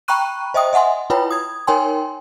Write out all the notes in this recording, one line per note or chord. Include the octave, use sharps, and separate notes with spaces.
G5 A#5 B5 C#6 F#6 D#7
C5 D#5 E5 G5 D#6
D#5 E5 F#5 G#5 C6
E4 F4 B4 C#5 G5 B5
D#6 G#6
D#4 A#4 C#5 G5 G#5 C6